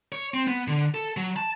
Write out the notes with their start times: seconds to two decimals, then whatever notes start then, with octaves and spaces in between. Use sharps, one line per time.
0.12 C#5
0.34 C4
0.48 B3
0.68 D3
0.94 A4
1.17 F#3
1.36 A5